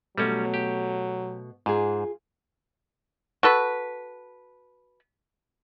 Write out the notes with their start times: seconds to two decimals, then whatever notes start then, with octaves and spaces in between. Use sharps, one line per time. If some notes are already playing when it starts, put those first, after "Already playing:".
0.18 B2 F#3 G3 A3 C#4
0.54 G4
1.66 G#2 F4 G#4
3.43 F#4 A4 B4